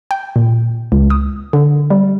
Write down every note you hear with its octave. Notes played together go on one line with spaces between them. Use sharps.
G5
A#2
C#2
D#6
D3
G3